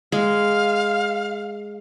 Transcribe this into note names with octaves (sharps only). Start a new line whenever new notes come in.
G#3 F5